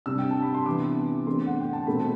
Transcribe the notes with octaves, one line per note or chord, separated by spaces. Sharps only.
C3 G3 D4 E6
G5
A5
B5
C6
C3 E3 B3 D4 D6
E2 D3 A3 C4 C6
F#5
G5
A5
B2 A3 C4 B5